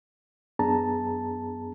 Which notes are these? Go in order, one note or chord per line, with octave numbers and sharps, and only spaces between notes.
F#2 B3 D4 G#4 A5 A#5